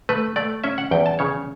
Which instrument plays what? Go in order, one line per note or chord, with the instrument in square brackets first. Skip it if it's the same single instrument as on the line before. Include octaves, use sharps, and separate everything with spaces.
[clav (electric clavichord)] A3 B4
A3 D5
C#4 E5
F#5
E2 G5
A5
C#3 C#5